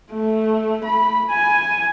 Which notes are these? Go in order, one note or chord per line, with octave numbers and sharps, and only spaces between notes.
A3
B5
G#5